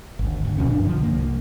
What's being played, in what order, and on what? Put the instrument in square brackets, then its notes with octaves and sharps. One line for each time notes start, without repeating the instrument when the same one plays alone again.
[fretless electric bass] G#1 D2
F#1 D2
D2 B2 F3 C#4
G2 D4
D3 F3
C2 A#3